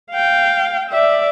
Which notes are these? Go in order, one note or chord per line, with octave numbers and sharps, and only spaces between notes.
F5 G5
D5 E5